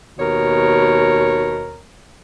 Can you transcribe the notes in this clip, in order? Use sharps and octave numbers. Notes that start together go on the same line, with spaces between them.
D#2 B2 A#4 C#5